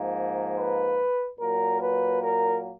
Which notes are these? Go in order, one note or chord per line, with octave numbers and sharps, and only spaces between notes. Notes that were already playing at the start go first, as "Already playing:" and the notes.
Already playing: G#2 F3 A#3
B4
A#2 F#3 A#3 A#4
B4
A#4